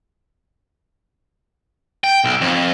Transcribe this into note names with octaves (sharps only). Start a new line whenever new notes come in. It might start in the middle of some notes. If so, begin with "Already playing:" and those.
G5
B1
F2